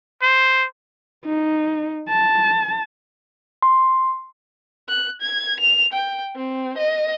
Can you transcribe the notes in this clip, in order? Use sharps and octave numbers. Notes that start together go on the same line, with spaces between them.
C5
D#4
A5
C6
F#6
G#6
F7
G5
C4
D#5